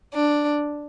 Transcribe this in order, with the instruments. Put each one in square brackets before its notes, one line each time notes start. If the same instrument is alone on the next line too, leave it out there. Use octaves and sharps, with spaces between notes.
[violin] D4